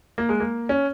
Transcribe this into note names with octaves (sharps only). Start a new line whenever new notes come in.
A#3
G#3
A#3
C#4